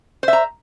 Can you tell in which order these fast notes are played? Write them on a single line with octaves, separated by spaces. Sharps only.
C5 E5 A#5